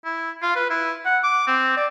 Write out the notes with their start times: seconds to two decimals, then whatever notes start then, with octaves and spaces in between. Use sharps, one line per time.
0.05 E4
0.42 F4
0.56 B4
0.70 E4
1.05 F#5
1.23 D6
1.47 C4
1.77 D5